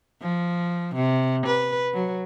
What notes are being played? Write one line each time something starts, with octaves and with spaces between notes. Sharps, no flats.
F3
C3
B4
F#3